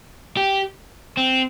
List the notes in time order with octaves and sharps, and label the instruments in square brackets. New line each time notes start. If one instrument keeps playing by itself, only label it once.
[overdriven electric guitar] G4
C4